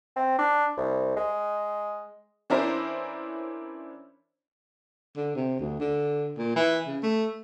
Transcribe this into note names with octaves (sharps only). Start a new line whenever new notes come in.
C4
D4
C2
G#3
E3 C#4 D4 E4 A#4 C5
D3
C3
D2
D3
A#2
E3
C#3
A3